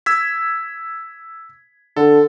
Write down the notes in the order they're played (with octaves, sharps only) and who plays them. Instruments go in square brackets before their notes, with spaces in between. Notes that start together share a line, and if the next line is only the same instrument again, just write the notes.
[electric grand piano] E6 G#6 B6
[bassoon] D3 [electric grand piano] A4